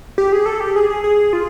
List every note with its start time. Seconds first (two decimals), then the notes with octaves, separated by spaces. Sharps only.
0.18 G4
0.32 G#4
0.46 A4
0.60 G4
0.76 G#4
0.90 G#4
1.04 G#4
1.33 F4